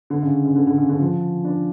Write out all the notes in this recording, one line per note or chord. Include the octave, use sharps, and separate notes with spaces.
D3
C#3
C#3
D3
D3
C#3
D3
F3
D4